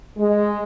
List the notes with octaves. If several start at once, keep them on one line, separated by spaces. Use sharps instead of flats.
G#3